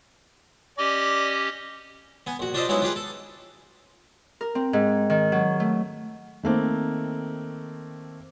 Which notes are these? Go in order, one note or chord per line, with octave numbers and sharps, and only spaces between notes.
C#4 G4 D5 D#5
B3 G#5
A#1 F#4
D4 F4 G4 A4 C5 D#5
F#3 G#3 B3 D#4 E4 F#4
F4 G4 G#4 B4
A4
A#4
C4
G#2
D#3
F#3
A3
D#3 A3 A#3 C4